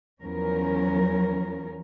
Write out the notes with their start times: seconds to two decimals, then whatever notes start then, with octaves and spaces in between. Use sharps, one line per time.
0.21 E2 F3 F#3 C#4 A#4